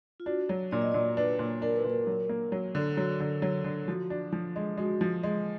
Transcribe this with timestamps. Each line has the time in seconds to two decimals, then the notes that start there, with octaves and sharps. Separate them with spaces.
0.20 F4
0.26 D4 F#4
0.49 F#3
0.71 A#2 D5
0.82 D#5
0.92 A#2 D5
1.17 D4 B4
1.39 A#2
1.62 D4 A#4
1.76 B4
1.84 A#2
1.90 A#4
2.07 F#3
2.29 A#3
2.52 F#3
2.75 D3
2.97 F#3
3.20 D3
3.42 F#3
3.64 D3
3.87 F3 F#4
4.10 D4
4.33 F3
4.56 G#3
4.77 G#3 F#4
5.01 F3
5.23 G#3